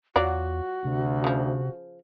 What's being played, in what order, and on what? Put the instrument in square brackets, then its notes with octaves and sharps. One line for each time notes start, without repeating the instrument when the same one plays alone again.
[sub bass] E2 [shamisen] F#3 F4 D5 [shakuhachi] F#4
[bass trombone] D2 [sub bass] C3
[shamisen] C#3 F3